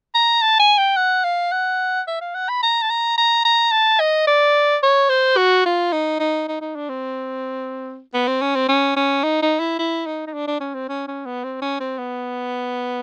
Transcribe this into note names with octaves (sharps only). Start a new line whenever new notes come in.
A#5
A5
G#5
G5
F#5
F5
F#5
E5
F5
F#5
B5
A#5
A5
A#5
A#5
A#5
A5
D#5
D5
C#5
C5
F#4
F4
D#4
D#4
D#4
D#4
D4
C4
B3
C4
C#4
C4
C#4
C#4
D#4
D#4
E4
E4
D#4
D#4
D4
D4
C#4
C4
C#4
C#4
B3
C4
C#4
C4
B3